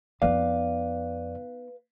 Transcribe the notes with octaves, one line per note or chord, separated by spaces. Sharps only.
F2 B3 D#4 B4 D5 F5